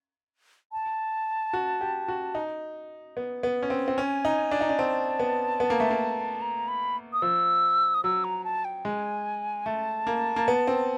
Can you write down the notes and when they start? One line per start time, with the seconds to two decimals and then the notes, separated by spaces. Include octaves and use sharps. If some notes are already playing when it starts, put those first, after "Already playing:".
0.72 A5
1.53 F#4
1.81 G4
2.08 F#4
2.35 D#4
3.17 B3
3.43 B3
3.63 C#4
3.70 C4
3.88 C4
3.97 C#4 G#5
4.25 D#4
4.51 D4
4.61 D#4
4.69 D4
4.78 C4 A5
5.20 B3
5.60 B3
5.70 A#3
5.80 A3
5.90 A#3
6.41 A#5
6.68 B5
7.13 D#6
7.22 F3 E6
7.94 D#6
8.04 F#3 E6
8.24 A#5
8.44 A5
8.65 G5
8.85 G#3 G#5
9.66 A3 A5
10.07 A#3
10.36 A#3
10.48 B3
10.67 C4